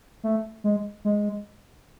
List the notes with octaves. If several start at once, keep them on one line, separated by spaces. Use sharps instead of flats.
A3
G#3
G#3